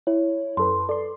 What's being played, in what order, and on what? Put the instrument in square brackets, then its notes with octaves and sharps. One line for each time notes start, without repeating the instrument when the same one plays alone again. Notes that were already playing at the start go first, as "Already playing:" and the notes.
[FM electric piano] E4 [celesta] C#5
[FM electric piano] F#2 A4 B4 [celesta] C6
[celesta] A4 [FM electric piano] D5 C6